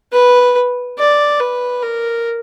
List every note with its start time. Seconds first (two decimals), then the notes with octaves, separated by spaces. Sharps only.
0.13 B4
0.98 D5
1.40 B4
1.83 A#4